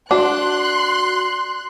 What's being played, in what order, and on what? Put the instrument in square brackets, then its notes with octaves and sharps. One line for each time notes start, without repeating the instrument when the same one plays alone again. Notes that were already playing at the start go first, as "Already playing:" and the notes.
[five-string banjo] D4 [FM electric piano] F#4 [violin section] C6 F#6